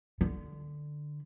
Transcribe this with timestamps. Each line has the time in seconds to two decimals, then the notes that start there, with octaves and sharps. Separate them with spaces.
0.21 D3